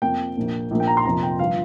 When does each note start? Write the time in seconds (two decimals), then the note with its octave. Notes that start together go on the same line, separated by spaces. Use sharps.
0.02 F2 F3 A#3 G5
0.37 A#1 A#2 A#3
0.71 A#1 A#2 A#3
0.80 G5
0.87 A#5
0.97 C6
1.05 F1 F2 F3 A#3 A#5
1.23 G5
1.39 G1 F3 F5